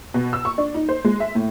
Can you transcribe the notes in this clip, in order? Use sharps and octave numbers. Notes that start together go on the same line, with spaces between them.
B2
E6
C#6
D4
D#4
C5
G#3
E5
A2